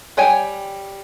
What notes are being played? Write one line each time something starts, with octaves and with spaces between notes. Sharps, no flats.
G3 C#5 G5 G#5